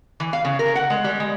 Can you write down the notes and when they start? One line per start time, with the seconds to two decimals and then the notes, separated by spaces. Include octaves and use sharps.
0.20 E3
0.33 F5
0.45 C#3
0.59 A#4
0.75 F#5
0.90 G#3
1.04 G3
1.20 G#3